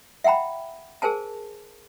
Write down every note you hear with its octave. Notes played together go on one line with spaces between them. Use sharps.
E5 F#5 G5 A#5 B5
G#4 A#4 C5 G#5 A5